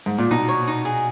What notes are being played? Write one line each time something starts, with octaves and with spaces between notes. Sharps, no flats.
G#2
A#2
B2 D#4
C#5
D#4
G#4